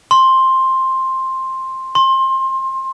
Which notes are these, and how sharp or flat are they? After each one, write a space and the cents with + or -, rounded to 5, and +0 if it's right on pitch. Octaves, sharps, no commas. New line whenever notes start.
C6 +10
C6 +25